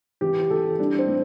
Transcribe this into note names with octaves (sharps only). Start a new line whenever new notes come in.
E3 G4
E3 A4
G3 D4
C4
A2